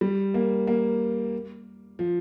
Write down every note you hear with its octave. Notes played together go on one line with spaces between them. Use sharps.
G3
A#3
A#3
F3